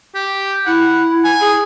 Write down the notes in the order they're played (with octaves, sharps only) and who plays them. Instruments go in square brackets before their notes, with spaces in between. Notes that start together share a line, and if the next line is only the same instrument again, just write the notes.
[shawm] G4
[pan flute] E4 [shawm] F#5
[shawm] G#5
[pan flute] G#4